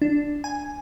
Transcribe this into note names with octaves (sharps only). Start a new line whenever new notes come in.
D4
G#5